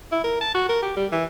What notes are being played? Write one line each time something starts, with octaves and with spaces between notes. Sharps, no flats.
E4
A#4
A5
F#4
A#4
G4
G3
E3